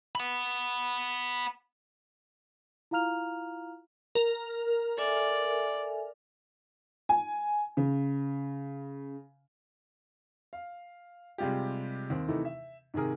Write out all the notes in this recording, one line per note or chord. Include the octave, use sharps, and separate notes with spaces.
F#5 B5
E4 F4 F5 A#5 F6 F7
A#4
A4 D5 E5 G#5
G#5
C#3
F5
C3 G3 G#3 F4 G4
D#2 C4
C3 D#3 E3 A3 D#4 E4
E5
G#2 C3 D#3 G#4 A#4